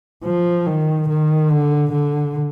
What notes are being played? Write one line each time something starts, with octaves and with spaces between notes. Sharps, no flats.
F3
D#3
D#3
D3
D3